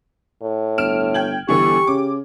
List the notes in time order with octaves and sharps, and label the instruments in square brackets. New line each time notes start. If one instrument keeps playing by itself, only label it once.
[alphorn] A2
[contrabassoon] G1 [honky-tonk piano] F6 D7 E7
[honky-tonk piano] G5 G#6 F#7
[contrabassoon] G1 [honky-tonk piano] D3 E3 [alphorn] G4 [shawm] C#6
[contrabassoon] C#3 [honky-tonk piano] D6